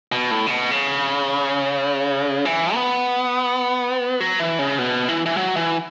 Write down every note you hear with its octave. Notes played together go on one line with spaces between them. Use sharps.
B2
A2
C#3
B2
C#3
E3
B3
F#3
E3
C#3
B2
E3
E3
F#3
E3